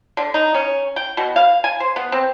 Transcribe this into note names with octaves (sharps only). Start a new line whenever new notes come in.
D3
D#4
C#4
G5
B2
F5
G#5
C5
B3
C4